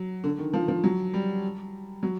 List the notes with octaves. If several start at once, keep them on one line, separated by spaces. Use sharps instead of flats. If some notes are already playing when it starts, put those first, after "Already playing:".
Already playing: F#3
D3
D#3
F3
F3
F#3
G3
F#3